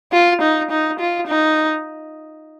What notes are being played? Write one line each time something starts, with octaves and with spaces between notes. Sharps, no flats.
F4
D#4
D#4
F4
D#4